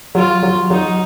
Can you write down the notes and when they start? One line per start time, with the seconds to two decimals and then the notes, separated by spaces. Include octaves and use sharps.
0.15 F#3 F4
0.43 F#3
0.70 F#3 D#4